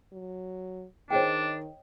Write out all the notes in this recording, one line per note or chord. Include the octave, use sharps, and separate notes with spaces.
F#3
D#3 D4 G#4 C5 C#5 D#5 G5